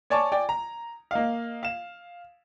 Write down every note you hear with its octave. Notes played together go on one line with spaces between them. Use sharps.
C#5 D5 G#5 A5 C#6 D6
D5 G5 G#5 D6
A#5
A#3 D#5 F5
F5 E7